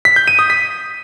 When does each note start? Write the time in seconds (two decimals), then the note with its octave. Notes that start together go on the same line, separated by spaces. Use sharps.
0.05 B6
0.16 G6
0.28 D#7
0.39 D#6
0.50 B6